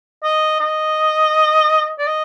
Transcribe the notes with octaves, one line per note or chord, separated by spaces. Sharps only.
D#5
D#5
D5
D#5